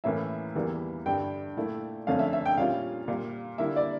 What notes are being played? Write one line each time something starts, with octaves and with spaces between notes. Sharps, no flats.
A2 E3 A#3 C#4 E4 E5
E2 E3 G3 A#3 E4
G2 D3 G3 G5
A#2 A3 E4
F2 D3 A3 C#4 F5
E5
E5
G5
A#2 G3 C#4 F4 F5
A#2 G3 A#3
D3 G3 A#3 E4 E5
D5